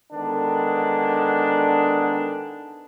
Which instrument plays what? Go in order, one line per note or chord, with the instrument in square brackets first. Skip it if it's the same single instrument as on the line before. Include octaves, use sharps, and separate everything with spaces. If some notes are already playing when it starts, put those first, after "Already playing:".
[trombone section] D3 D#3 G#3 B3 D4